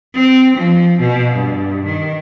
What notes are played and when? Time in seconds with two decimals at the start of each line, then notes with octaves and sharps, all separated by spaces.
0.14 C4
0.57 F3
1.00 B2
1.35 G2
1.86 D#3